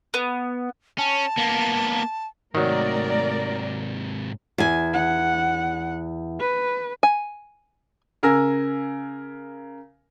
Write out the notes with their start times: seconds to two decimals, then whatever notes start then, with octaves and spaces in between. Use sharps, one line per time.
0.14 B3
0.98 C#4 A5
1.37 A#3 B3
2.55 G#2 C3 D#3 F#3 A3 A#4 D5
4.58 E2 G#5
4.93 F#5
6.40 B4
7.03 G#5
8.23 C#3 A#4 G#5 E6 A#6